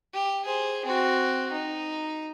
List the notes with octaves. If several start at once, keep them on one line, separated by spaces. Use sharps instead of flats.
G4
G#4 C5
C4 F#4
D#4